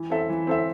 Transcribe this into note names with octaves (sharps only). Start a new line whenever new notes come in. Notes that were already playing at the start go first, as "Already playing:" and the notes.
Already playing: E3
C4 A4 E5
E3
C4 A4 E5